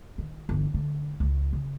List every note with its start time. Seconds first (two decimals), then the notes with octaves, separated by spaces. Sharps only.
0.18 D#3
0.49 G1 E3
0.74 D3 A3
1.20 C#2 A3
1.53 C#3